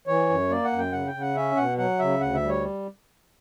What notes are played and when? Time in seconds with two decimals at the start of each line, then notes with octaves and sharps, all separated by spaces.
0.07 E3 C#5
0.29 F#2
0.50 A#3 D5
0.65 F#5
0.72 F#2
0.78 G5
0.92 C#3 F#5
1.07 G5
1.14 C#3
1.21 F#5
1.35 C#4 E5
1.57 B2 F#5
1.78 F#3 F#5
1.99 C#3 E5
2.20 D2 F#5
2.35 E5
2.42 G3
2.49 C#5